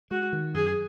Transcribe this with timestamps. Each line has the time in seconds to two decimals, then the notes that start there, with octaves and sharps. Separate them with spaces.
0.11 G#3 F#4
0.33 D#3
0.54 F#2 G#4